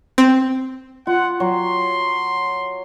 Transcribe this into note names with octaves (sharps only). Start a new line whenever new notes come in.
C4
F4 F#5
F#3 C6